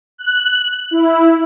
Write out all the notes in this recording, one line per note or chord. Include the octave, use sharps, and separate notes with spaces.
F#6
E4